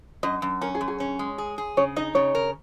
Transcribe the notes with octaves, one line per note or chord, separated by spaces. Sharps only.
F#2 D#5
F#2
C#4 A#4
G#4
F#2
G#4
C#4
G#3
G#4
G#4
C#3 C#5
D#4 D#5
C#3 C#5
A#4